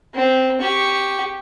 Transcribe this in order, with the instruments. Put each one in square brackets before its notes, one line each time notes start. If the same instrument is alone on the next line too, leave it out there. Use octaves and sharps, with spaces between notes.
[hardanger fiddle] C4
G4 C#6